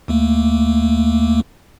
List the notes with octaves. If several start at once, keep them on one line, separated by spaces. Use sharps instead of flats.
D#2 A3 A#3